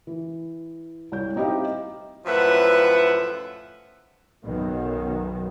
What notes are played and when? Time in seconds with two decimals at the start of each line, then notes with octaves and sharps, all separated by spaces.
0.07 E3
1.12 C2 C#5 G6
1.36 C4 D#4 E4 G4 D#5 F5
2.26 F#2 A2 F3 B4 E5 F#5
4.44 B1 F#2 B2 D#3